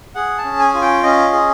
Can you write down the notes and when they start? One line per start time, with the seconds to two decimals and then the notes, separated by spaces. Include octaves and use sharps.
0.15 G#4 F#5
0.38 A5
0.45 C#4
0.59 G#5
0.74 F4
0.82 G5
1.03 C#4 D#5
1.32 G#4